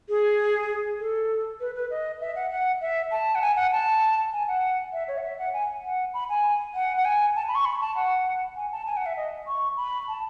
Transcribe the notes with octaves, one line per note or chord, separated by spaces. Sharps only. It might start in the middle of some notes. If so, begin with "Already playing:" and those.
G#4
A4
B4
B4
D#5
E5
F#5
F#5
E5
A5
F#5
G#5
F#5
A5
G#5
F#5
E5
C#5
F#5
E5
F#5
G#5
F#5
B5
G#5
F#5
F#5
G#5
A5
B5
C#6
B5
A5
F#5
G#5
A5
G#5
F#5
E5
D#5
C#6
B5
A5